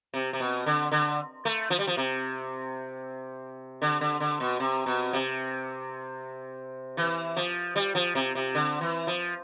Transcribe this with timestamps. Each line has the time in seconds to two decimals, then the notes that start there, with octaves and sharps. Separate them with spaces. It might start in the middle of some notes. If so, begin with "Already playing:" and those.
0.14 C3
0.33 C3
0.40 B2
0.66 D3
0.92 D3
1.45 A3
1.70 F3
1.79 G3
1.87 F3
1.97 C3
3.82 D3
4.01 D3
4.20 D3
4.40 B2
4.60 C3
4.86 B2
5.13 C3
6.97 E3
7.36 F3
7.76 G3
7.95 F3
8.15 C3
8.35 C3
8.55 D3
8.81 E3
9.07 F3